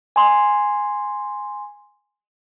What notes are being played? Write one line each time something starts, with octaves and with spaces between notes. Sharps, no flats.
G#5 C6